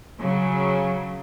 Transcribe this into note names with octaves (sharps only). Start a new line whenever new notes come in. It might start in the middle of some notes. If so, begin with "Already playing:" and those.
C#3 F#3